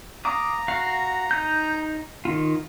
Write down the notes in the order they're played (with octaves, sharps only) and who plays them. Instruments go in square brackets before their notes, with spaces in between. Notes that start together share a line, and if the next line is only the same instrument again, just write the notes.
[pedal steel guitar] F5 D6 D#6 [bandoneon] A#5
[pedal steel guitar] F#4 F5
D#4 G6
D#3 F4